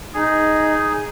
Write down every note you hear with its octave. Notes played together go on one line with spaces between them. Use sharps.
D#4 G#4